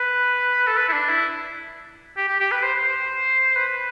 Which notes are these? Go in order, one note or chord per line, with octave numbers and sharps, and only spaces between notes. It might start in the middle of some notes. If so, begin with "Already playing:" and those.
Already playing: B4
A4
B4
E4
D4
E4
G4
G4
G4
B4
C5
C5
B4